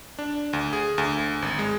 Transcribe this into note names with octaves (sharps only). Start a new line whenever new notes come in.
D4
D2
G#4
D2
G#1
G#3